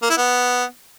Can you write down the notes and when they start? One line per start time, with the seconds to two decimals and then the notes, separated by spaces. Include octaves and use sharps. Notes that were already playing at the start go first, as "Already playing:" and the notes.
0.03 A#3
0.10 E4
0.17 B3